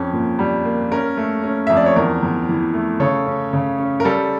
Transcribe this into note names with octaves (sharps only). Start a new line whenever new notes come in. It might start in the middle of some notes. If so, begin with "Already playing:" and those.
Already playing: F2 C#4
A#2
G3
A#3
C#4 A#4
A3
C#4
F2 E5
D5
C#5
E2 A#4
E2
E3
A3
C#3 A4 C#5
C#4
C#3
C#4
A#4
G3 A4